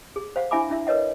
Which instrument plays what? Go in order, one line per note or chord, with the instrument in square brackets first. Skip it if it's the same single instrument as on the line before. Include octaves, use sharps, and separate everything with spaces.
[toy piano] G#4
C5 F5 F#5
D4 E4 E5 G#5 B5 D6
D4 E4 E5
A#4 B4 C#5 D#5 F#5